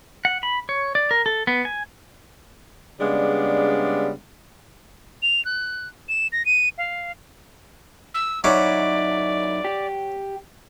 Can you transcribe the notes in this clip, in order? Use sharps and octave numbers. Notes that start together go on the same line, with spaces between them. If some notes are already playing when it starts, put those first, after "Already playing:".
F#5
B5
C#5
D5
A#4
A4
B3
G#5
C#3 G3 G#3 B3 D4
F7
F#6
E7
A#6
D#7
F5
E6
F#2 F#3 C#4 D#4 E4 D5 D6
G4